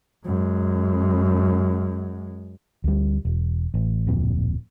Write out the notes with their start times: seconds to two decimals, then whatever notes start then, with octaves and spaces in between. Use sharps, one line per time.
0.25 F#2 G#3
2.84 D2 G3
3.25 E1
3.74 A1
4.07 D1 F2 A#2